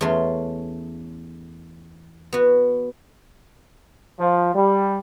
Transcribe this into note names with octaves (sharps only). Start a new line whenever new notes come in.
E2 A3 C#4 C6
B3 F#4
F3
G3